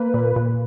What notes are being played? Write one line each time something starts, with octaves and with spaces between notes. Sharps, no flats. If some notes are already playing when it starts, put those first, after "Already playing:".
Already playing: A#3 B4
A#2
A#2